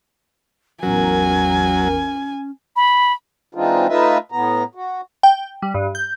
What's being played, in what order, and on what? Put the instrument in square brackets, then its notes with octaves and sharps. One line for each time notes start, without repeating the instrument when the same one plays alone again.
[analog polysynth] A1 E2 A#4 [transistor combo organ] F#3 [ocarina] C#4 [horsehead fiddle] G#5
[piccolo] B5
[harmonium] E3 G#3 C4 D4 D#4 F4
A3 D#4 F4 B4 D#5 E5
A2 B3 A#5
F#4
[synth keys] G5
G3
G2
G6